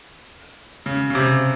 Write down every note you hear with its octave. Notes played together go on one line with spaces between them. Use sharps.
C#3
C#3
C3